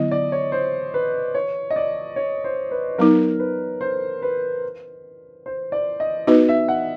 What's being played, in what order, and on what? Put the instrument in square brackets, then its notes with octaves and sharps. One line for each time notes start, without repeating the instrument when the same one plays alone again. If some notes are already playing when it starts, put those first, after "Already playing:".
Already playing: [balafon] D3 F#3 B3 E4 [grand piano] D#5
[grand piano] D5
C#5
C5
B4
C#5
D#5
D5
C#5
C5
B4
[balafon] F#3 B3 D#4 [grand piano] A#4
[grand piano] B4
C5
B4
C5
D5
D#5
[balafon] B3 D#4 F#4 B4 [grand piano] D#5
[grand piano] E5
F#5